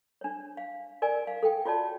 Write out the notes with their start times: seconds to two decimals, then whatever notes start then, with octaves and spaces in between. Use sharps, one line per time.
0.21 D4 C#5
0.57 F5
1.02 A#4 D5 G#5
1.27 F5
1.43 A4 G5
1.65 F4 F#4 C#5 D5 A5